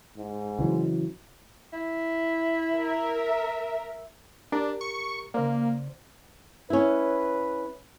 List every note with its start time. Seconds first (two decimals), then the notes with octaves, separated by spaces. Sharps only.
0.18 G#2
0.59 C#3 E3 F#3
1.73 E4
2.75 A#4 E5
4.52 D4 G4 A#4 A#5
4.81 C#6
5.34 C#3 A#3 C5 D5
6.70 C#4 E4 B4